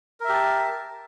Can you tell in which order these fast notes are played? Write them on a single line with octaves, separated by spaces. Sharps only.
A#4 E5 G4 A5